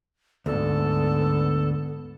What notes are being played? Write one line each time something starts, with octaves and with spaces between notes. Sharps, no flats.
D2 G#2 D3 B3 A4